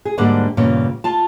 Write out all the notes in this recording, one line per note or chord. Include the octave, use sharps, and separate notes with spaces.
G#4
D2 G#2 D3 G3 A#3 D4
E2 G2 A#2 C#3
F4 A5